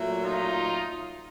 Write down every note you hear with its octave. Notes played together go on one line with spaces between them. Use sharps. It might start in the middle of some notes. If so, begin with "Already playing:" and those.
Already playing: A#2 F#3 A3
D#4 F4